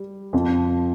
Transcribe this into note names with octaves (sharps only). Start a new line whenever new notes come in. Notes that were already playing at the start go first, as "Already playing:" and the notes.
Already playing: G3
F2 F3